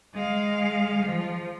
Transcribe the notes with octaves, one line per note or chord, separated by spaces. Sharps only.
G#3 F5
F3